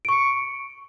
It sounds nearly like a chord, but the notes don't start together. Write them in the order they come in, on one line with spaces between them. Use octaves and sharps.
D7 C#6 C#7